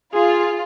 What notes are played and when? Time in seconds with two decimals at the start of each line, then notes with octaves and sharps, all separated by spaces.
0.14 F4 G#4